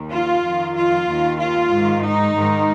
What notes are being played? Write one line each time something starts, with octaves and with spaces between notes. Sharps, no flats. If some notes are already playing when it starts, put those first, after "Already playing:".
Already playing: D#2 D#3
F4
F2 D#3
F4
D#2 D#3
F4
G#2 D#3
D#4
G#2 D#3